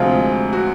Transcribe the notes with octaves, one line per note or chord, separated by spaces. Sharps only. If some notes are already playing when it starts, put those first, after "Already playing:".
Already playing: D2 C3 F3 G#3 F4
F#4